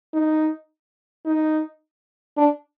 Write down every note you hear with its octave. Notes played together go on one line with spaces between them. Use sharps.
D#4
D#4
D4